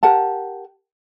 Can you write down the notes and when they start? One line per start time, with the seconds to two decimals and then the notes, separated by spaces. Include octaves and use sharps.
0.03 G4 A#4 F#5 A5